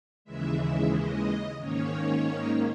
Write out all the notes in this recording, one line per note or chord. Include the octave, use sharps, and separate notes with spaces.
D#2 C#3 E3 G#3 E5
E5
D#5
G#2 D#3 A#3 C#4 C#5